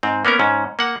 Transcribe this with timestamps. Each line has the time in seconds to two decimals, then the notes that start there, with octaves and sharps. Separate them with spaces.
0.03 G#2 C4
0.25 A#3 B3 C#4 A#4
0.39 G#2 C#4
0.79 A#3 F#5